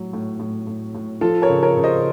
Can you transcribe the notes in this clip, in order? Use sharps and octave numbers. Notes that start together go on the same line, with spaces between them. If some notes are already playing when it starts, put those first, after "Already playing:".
Already playing: A2 F#3
A2
A2
A2
A2
F3 F4 A4
A#4 C#5
C#3
A#4 C#5
C#3
C5 D#5